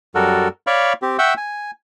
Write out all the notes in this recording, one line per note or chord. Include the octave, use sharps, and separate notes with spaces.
F#2 G3 F#4 A4 A#4
C#5 D5 F5 B5 C#6
C4 G4
E5 F#5 G5 C#6 E6 G6
G#5